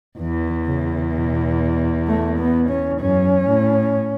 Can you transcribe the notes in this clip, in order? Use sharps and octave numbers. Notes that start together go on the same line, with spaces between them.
E2 E3
C#3
B2
A3
B3
C#4
F#2 C#4
A2